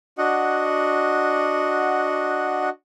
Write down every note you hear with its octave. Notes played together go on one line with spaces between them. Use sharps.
D4 F#4 D#5 F#5